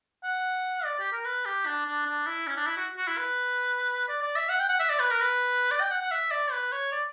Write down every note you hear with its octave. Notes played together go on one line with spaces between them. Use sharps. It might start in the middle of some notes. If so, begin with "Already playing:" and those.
F#5
D5
G4
A#4
B4
G4
D4
D4
D4
E4
C#4
D4
E4
F#4
F#4
E4
B4
D5
D5
E5
F#5
G5
F#5
E5
D5
B4
A#4
B4
D5
G5
F#5
F#5
E5
D5
B4
C#5
D5